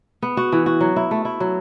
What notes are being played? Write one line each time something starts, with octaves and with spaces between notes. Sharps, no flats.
B3
F#4
E3
F#4
F#3
E4
A3
E4
F#3